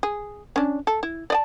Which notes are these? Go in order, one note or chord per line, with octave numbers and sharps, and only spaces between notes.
G#4
C#4 D4
A4
E4
D5 D#5 A5